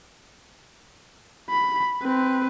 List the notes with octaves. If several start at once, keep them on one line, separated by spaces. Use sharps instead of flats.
B5
C4 B4